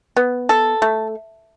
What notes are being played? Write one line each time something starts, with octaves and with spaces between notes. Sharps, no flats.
B3
A4
A3